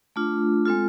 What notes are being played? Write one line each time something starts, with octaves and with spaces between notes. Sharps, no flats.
A3 D4 F4
G#3 C4 F4 A4